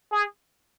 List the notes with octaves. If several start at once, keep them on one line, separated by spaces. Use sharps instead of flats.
G#4